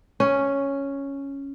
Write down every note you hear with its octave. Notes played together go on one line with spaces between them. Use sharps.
C#4